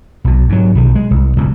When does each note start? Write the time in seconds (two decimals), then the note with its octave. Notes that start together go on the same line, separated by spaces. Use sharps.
0.24 B1 B2
0.49 G#2 F#3
0.75 B1 D#3
0.95 G#3
1.11 C2
1.37 D1 C#2 B2